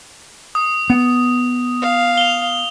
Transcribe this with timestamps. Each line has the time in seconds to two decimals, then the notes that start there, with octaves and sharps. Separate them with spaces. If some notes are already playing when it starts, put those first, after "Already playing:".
0.55 D#6
0.90 B3
1.82 F5
2.17 F7 G7